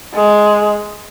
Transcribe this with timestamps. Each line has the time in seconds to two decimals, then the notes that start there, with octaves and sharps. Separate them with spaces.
0.15 G#3